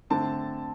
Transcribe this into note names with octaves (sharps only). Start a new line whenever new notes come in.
D3 A3 C4 A5